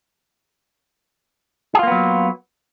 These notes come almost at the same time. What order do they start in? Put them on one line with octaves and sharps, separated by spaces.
G#4 F4 A#3 B3 F#3